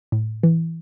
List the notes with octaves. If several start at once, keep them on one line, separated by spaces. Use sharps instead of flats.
A2
E3